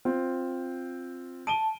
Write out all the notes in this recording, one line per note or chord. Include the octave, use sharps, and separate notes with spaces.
C4 F4
A5 D7 D#7 G7